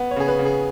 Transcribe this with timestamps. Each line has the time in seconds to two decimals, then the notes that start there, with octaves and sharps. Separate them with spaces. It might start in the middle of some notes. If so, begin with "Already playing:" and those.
Already playing: B3
0.11 C#5
0.16 C#3 G#4
0.28 B4
0.39 C#3
0.45 G#4